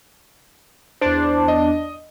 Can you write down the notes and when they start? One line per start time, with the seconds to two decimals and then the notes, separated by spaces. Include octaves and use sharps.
1.01 E2 D4 C5
1.48 D#5